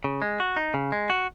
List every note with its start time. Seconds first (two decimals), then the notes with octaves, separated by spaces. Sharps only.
0.04 C#3
0.22 G#3
0.40 F#4
0.57 D#4
0.74 C#3
0.92 G#3
1.10 F#4